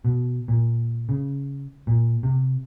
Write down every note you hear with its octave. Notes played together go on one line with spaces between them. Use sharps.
B2
A#2
C#3
A#2
C3